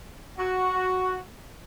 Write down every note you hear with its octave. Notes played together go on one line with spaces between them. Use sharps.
F#4